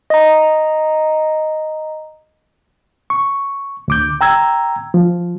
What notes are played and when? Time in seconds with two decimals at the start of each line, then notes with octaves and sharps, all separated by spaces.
0.10 D#5 A#5
3.10 C#6
3.88 D2 D6 G6
4.21 G5 A#5 E6 G#6
4.94 F3